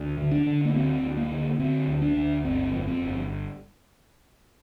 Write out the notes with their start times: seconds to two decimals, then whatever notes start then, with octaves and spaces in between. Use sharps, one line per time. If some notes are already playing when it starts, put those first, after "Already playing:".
Already playing: D2
0.17 D3
0.31 D4
0.46 D3
0.65 A#3
0.74 D2 C4
1.02 D2
1.17 A#3
1.31 D3
1.59 D3 C4
1.88 D2
2.02 D4
2.17 D2
2.45 G1 C4
2.73 F2
2.87 C4
3.02 G1